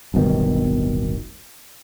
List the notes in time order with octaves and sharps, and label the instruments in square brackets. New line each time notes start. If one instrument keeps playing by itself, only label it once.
[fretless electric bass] D1 G1 B2 D#3